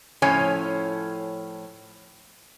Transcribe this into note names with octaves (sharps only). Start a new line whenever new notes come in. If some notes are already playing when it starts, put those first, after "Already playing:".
A2 F3 C#4 C#5 G#5